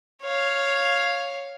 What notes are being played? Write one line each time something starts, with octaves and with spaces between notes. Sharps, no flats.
C#5 F5